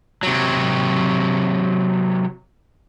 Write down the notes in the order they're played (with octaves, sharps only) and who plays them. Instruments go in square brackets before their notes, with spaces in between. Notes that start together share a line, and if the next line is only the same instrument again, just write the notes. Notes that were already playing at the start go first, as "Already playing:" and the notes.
[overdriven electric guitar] C3 F#3